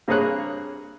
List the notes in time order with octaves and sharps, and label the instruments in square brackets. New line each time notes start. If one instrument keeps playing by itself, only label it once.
[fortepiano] G2 A#3 C4 G#4 C#5 F#6